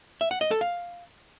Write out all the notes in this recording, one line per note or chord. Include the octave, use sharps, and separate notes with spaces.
E5
F#5
D#5
A4
F5